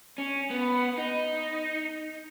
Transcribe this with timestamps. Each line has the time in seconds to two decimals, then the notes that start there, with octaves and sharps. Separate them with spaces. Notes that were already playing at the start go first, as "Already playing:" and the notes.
0.18 C#4
0.50 B3
0.98 D#4